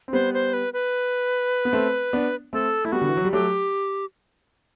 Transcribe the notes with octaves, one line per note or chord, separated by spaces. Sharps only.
C4
G3 B3 C5
C5
B4
B4
B3
A3 C4
B3 D4
A3 C4 A4
A3 E4
G3 B3 F#4
D3
E3
F#3
G3
F#3 A3 G4